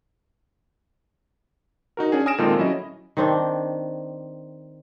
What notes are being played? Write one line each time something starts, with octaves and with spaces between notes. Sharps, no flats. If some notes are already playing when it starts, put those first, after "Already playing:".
D#4 F#4 A#4
C#4 D4 G#4
G#5 D#6 F6 A#6 D7 E7
A#2 D#3 G#3 C4 F4 A4
F#3 C#4 E4 D#5
D#3 C4 D4